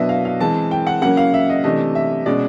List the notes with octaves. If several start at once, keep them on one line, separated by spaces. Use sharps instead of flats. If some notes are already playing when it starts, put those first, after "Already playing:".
Already playing: B2 F#3 B3 D4 D#5 E5
F5
F5
E3 G#3 C4 A5
G5
F#5
C#3 F#3 A#3 C#4 F#5
F5
E5
D#5
C3 E3 A3 D4 D#5
E5
B2 G#3 C#4 D5